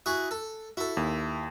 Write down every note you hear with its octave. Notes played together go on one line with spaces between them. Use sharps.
E4 F#4 G#4
A4
E4 F#4 A4
D#2